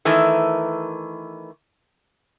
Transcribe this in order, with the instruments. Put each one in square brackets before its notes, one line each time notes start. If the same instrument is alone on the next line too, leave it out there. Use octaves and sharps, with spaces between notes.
[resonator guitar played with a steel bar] D#3 E3 A3